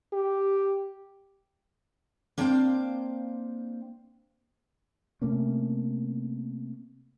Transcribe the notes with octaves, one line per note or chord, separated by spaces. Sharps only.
G4
A#3 C4 D4 C5 F5 G5
C3 A3 A#3 C#4